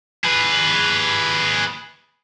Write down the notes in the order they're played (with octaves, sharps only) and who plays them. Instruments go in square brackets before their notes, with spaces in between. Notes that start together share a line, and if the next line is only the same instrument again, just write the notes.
[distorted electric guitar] G#4 B4